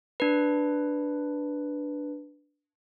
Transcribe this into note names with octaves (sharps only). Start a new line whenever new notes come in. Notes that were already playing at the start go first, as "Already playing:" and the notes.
D4 B4